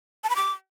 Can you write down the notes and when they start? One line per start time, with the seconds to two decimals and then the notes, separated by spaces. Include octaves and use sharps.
0.24 A5
0.30 B5
0.36 D6